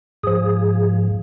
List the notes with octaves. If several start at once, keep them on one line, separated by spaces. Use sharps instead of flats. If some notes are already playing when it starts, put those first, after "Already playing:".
G#2 F3 G#4